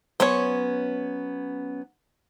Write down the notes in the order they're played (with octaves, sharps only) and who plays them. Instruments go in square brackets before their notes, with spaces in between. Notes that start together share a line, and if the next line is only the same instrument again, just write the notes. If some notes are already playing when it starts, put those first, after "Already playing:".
[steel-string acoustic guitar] F#3 B3 C#4 [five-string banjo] C5 C#5